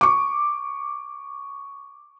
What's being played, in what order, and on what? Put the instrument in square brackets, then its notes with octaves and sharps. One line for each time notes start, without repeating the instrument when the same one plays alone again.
[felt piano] C#6 D6